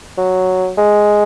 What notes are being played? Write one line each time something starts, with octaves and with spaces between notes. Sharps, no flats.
F#3
G#3